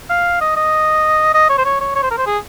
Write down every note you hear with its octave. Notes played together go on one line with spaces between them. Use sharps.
F5
D#5
D#5
D#5
C#5
C5
C#5
C#5
C#5
C5
A#4
C5
G#4